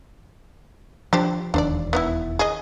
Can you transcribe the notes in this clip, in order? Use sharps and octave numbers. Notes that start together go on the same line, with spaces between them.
F3 D4 G4 C5
E1 D#2 D4 C5 D5
B3 D#4 E4
G#4 D#5